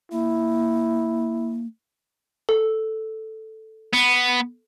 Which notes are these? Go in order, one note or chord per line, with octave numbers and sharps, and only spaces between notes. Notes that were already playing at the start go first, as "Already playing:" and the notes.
A#3 E4
A4
B3